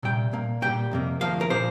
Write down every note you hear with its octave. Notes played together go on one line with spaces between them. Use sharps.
C2 A#2 G3 G5
A#2 A#3
A#2 G3 A#3 G5
F2 C3 A#3
D2 C3 F3 A#3 F5
A#4
A#2 F3 A#3 C5